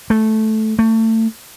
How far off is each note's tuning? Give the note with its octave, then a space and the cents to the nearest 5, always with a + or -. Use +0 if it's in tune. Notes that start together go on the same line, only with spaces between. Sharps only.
A3 -10
A3 +30